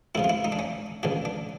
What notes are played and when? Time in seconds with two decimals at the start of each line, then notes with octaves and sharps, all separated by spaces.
0.15 F2 C#3 F3 E4
0.24 F4
0.29 E4
0.44 D#4
0.52 D4
0.59 C#4
1.03 C#2 C#3 F3 D4
1.25 D4